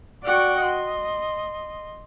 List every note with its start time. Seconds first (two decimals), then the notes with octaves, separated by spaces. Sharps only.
0.24 F#4 D5 F#5 G5 C#6
0.61 D#5 C6